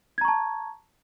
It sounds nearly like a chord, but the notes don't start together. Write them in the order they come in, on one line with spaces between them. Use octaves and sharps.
G#6 A#5 C#6 A5